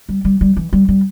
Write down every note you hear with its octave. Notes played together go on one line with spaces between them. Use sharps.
G3
G3
G3
E3
G3
G3